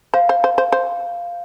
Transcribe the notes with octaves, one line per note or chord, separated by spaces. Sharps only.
C5 F5
C5
C5
C5
C5